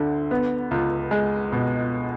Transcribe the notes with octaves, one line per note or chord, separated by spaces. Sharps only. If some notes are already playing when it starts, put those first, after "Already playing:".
Already playing: D2 D3
B3
C#2
G#3
B2